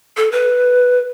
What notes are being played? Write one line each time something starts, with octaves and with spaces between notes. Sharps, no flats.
A4
B4